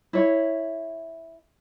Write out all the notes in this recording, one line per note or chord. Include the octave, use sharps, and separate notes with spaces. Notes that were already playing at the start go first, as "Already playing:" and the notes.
E4 C#5